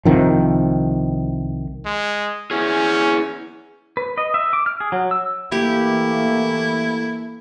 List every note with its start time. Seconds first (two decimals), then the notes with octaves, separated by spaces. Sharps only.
0.05 C2 C3 D#3 F3
1.86 G#3
2.51 C#4 E4 G#4
3.97 B4
4.18 D#5
4.34 E5
4.53 D6
4.66 F6
4.80 G#4
4.92 F#3
5.11 E6
5.52 E3 A3 A#3 E4 G4